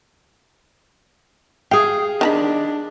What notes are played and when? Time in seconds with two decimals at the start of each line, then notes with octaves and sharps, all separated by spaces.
1.71 G#4 F5 G5
2.21 D#3 D4 A#5 B5